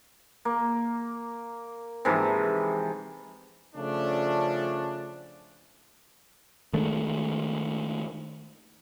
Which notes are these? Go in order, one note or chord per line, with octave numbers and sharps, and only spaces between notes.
A#3
G#2 C3 E3 F3
C#3 F3 A3 C#4 D4
D#3 G#3 A3 D4